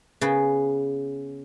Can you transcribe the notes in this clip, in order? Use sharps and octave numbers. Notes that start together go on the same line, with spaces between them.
C#3 B3